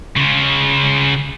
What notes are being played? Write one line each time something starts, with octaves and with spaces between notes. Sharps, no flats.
C#3 F4